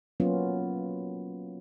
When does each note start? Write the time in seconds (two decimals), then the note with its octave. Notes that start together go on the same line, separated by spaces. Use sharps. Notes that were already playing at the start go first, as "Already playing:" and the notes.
0.20 F#3 A#3 B3 C#4 F4